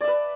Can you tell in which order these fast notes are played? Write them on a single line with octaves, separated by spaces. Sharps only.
D5 E5 B4